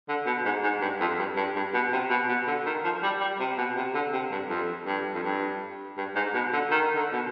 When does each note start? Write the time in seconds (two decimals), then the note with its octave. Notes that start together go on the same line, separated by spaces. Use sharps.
0.09 D3
0.26 B2
0.45 G#2
0.63 G#2
0.82 G2
1.00 F2
1.19 G2
1.37 G2
1.56 G2
1.74 B2
1.93 C3
2.11 B2
2.29 B2
2.47 D3
2.66 D#3
2.84 F3
3.03 G3
3.21 G3
3.40 C3
3.58 B2
3.77 C3
3.94 D3
4.13 C3
4.31 G2
4.50 F2
4.87 G2
5.14 F2
5.24 G2
5.97 G2
6.16 G#2
6.34 B2
6.52 D3
6.71 D#3
6.96 D3
7.13 B2